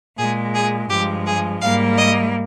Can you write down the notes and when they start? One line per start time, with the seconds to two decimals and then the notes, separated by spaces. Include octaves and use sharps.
0.17 A#2 G#3 G#4
0.53 G#4
0.88 G2 F3 G#3 G4
1.26 G#4
1.60 G#2 G3 A#3 F5
1.97 D#5